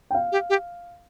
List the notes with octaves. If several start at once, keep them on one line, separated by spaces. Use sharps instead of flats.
G5
F5
G4
G4